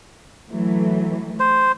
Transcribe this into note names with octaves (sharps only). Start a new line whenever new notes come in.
E3 F#3 A3
C5